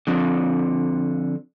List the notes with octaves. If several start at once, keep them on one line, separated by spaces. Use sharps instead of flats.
D3 F3 C4